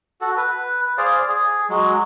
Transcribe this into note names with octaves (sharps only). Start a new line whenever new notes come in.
F#4 A4
B4
G#4 C5 D5 F5
G#4
F#3 G#3